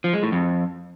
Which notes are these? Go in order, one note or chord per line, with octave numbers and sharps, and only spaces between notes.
F3
G#3
A2
F2